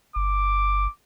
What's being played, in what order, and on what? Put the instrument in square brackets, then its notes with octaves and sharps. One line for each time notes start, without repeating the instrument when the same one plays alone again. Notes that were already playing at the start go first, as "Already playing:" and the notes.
[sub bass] G1 [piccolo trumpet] D6